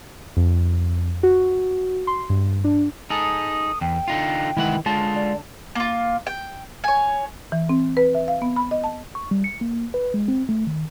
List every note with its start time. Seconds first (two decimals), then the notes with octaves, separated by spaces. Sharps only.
0.37 F2
1.23 F#4
2.07 C6
2.30 G2
2.64 D4
3.10 D#4 G#4 A4 D#6
3.81 E2 G5
4.08 D3 D#4 F4
4.57 C2 D#3 E3 G#3 E4 F#5
4.86 D3 G#3 F4 A5
5.15 D5
5.75 A#3 F4
6.27 G5
6.84 C#5 G#5
7.52 E3
7.69 C4
7.97 B4
8.14 E5
8.28 F5
8.42 B3
8.56 B5
8.71 D#5
8.84 A5
9.15 C#6
9.31 G3
9.44 C#7
9.61 A#3
9.94 B4
10.14 G#3
10.28 C4
10.49 A3
10.67 D#3